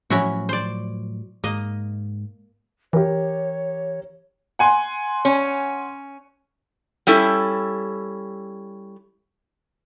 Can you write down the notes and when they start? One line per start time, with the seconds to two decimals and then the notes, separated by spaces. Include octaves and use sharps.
0.10 A2 F3 F#3 C#4 E4 F#4
0.49 C5 D5
1.44 G#2 A#3 D#5
2.93 E3 G4 A#4 C#5
4.59 F#5 G#5 C6
5.25 C#4
7.07 G3 C#4 E4 A4